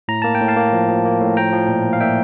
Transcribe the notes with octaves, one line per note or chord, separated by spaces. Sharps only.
A2 A#5
A#3 A5
G5
A2
F5 A5
A#3
F3
F3
A#3
A2
F3 G5 A#5
F3
A#2
A#3
F5
A#2 E5 G5